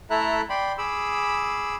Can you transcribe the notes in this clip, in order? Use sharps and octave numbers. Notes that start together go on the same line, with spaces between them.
A3 E4 A4 E5 A#5 F#6
D5 G5 B5 C6
G#4 B5 D6 E6